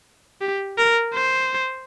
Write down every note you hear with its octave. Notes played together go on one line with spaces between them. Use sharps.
G4
A#4
C5